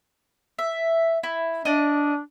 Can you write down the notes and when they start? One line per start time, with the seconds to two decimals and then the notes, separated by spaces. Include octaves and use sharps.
0.59 E5
1.23 E4
1.65 D4 D5 D#5